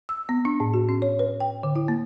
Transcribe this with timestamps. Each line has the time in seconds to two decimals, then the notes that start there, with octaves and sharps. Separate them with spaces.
0.09 E6
0.29 B3
0.45 D4
0.60 A2
0.74 F#4
0.89 C#4
1.02 C#5
1.19 B4
1.40 G5
1.63 D3
1.76 E4
1.88 A#3